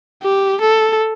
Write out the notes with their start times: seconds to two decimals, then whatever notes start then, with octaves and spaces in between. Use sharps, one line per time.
0.22 G4
0.61 A4